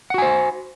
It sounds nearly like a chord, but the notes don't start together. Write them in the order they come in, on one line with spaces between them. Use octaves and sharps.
F#5 F#4 G#5 C5